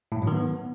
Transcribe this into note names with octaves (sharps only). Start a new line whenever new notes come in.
A2
G#2
F#3
D#3
B3